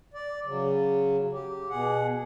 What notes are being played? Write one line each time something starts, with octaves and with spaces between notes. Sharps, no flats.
D5
C#3 F#3
G4
B2 G#4 F#5